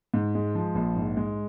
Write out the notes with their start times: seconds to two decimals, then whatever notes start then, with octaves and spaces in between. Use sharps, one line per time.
0.14 G#2
0.35 G#3
0.55 F3
0.75 A#1
0.96 G#2
1.17 G#3